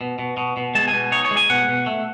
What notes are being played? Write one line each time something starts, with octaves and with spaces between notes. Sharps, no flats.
B2
B2
B2
B2
G#3 A5
G#5
B2
D#4 C#5
C#5
G#3
G#5
B2 F#5
B2
A3